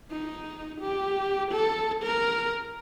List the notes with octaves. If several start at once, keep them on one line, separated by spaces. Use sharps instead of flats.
D#4
G4
A4
A#4